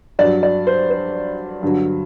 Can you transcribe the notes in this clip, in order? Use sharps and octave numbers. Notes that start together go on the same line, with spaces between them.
G2 F#3 D5
D5
C5
C5
G2 D3 F#3